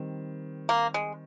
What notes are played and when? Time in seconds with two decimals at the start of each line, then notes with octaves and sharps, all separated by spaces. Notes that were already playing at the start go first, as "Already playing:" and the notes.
Already playing: D#3 G3 C4
0.69 A#3
0.94 G#3